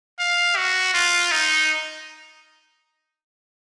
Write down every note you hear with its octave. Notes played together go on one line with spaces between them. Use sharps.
F5
F#4
F4
D#4